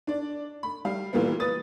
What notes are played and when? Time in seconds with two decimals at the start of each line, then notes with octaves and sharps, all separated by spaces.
0.07 D4 D5
0.63 B5
0.85 G3 F5
1.13 A#2 E3 G3 A#3 B3
1.40 B4 D#6 A6